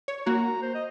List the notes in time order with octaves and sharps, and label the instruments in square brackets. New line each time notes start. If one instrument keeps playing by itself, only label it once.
[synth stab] C#5
[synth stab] A#3 F#4 [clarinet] A#5
[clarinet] C5
D#5